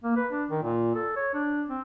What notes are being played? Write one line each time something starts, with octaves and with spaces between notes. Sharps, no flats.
A#3
B4
D4
D#3
A#2
A4
C#5
D4
C4